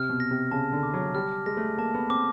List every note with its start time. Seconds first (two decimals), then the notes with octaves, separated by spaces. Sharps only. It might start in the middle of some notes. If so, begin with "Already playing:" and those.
Already playing: C3 F6
0.10 B2
0.20 A#6
0.31 C3
0.51 C#3 A5
0.72 D3
0.83 D6
0.94 F#3
1.15 G3 F6
1.46 G#3 A#6
1.57 A3
1.78 A#3 A5
1.94 B3
2.10 C4 D6